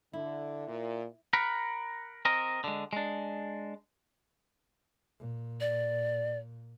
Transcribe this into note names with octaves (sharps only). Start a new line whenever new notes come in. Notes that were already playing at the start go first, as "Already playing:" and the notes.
D3 E4
A#2
A#4 F#5 B5
C4 A#4 D#5
D3 G#3
G#3 D4
A#2
D5